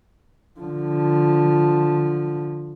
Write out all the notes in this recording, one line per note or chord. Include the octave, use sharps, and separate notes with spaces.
D3 F3